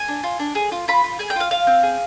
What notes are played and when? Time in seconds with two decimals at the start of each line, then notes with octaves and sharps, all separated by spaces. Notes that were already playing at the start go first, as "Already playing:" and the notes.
Already playing: G#5
0.08 D4
0.23 F4
0.39 D4
0.55 G#4
0.72 F4
0.88 F4 B5
1.04 F4
1.19 G#4 G#5
1.30 G5
1.36 F4 F5
1.51 F4 F5
1.67 C4
1.83 G#4